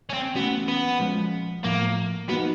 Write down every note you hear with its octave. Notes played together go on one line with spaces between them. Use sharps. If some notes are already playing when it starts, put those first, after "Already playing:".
C#4
C4
E3 A3 B3 C#4 F#4
B3
A#2 F3 G#3 C#4
A2 F3 A3 A#3
F3 A#3 B3 D#4 F#4